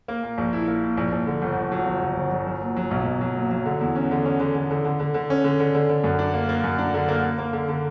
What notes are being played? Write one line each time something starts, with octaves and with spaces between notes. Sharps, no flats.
A#3
A#2
A#1
E4
A#3
A#2
A#1
A#1
D3
G1
G1
F#3
G1
G1
G1
F#3
F#3
A#2
F#3
B1
B1
F#3
A#2
F#3
D3
E2
C#4
D3
C#4
D3
D3
D3
D3
D3
D3
C#4
D3
D3
D3
D3
F#2
D4
A#3
A#3
F#2
D4
D3
A#3
A#3
A#3
D3
D3